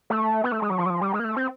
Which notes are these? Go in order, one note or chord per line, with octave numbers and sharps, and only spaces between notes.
A3
B3
A3
G#3
F#3
F3
F#3
F3
G3
G#3
A#3
A3
C4